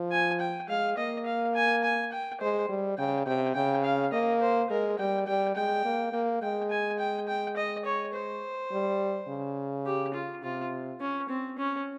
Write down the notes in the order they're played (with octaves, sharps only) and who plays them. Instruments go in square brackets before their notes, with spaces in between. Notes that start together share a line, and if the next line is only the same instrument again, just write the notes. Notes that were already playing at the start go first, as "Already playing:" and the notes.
Already playing: [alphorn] F3
[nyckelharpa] G#5
G5
[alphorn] G#3 [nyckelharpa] F5
[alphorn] A#3 [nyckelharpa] D#5
[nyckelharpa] F5
G#5
G#5
G5
[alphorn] G#3 [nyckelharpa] C5
[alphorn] G3
[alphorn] C#3 [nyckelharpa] G5
[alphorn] C3 [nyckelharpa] G5
[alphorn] C#3 [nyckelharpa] G5
[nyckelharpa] F5
[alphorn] A#3 [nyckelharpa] D#5
[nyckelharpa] C5
[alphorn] G#3 [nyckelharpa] A#4
[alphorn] G3 [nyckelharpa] G5
[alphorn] G3 [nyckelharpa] G5
[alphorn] G#3 [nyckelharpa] G5
[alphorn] A#3
A#3
[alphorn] G#3 [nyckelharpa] G5
[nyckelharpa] G#5
G5
G5
D#5
C#5
C5
[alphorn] G3
C#3
[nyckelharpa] G4
F4
[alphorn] C3 [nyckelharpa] F4
[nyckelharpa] C#4
C4
C#4